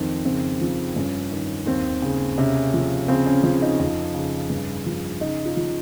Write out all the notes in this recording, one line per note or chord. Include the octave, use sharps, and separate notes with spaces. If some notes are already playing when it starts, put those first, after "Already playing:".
Already playing: F2 D#3 C4
C#3 C4
F3
G2 C#4
D#3
D#2 C4
C#3
C3 C#4
F3
C#3 C4
C#4
F3 C#4
D#4
F2
C#3
G2
F3
C#3 D#4
F4
F3